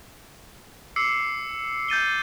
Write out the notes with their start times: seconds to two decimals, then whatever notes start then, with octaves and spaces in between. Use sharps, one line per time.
0.96 D6 E6 C7 C#7
1.89 G6 A6 D#7 G7